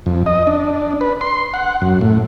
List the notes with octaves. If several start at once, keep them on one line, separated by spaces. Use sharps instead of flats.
F2
D#5
D4
B4
C6
F#5
F#2
A2